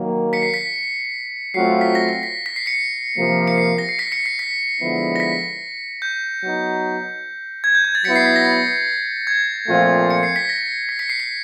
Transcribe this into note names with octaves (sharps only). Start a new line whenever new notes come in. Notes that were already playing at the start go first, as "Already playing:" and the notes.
Already playing: D#3 F#3 A#3
B6 C#7
C7
B6
F#3 A3 C4 F4 C7
B6
A#6
A#6
B6
B6
C7
B6 C#7
C3 F3 A#3
C#7
C7
A#6
C7
B6 C#7
B6 C#7
C7
B6
D3 F3 G#3 B3 E4
A#6
B6
G6
F#3 B3 D#4
G#6
G6
G#6
A6
F#3 B3 E4 B6 C#7
C7
B6
A#6
A6
G#6
A#2 F3 A3 C4 F4
C#7
C7
B6
A#6
B6
B6 C#7
C7
B6